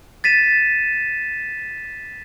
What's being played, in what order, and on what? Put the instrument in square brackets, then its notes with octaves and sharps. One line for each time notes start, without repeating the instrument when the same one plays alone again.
[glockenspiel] A6 B6 D#7 E7